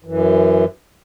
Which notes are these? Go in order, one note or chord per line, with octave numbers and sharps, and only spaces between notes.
F#2 E3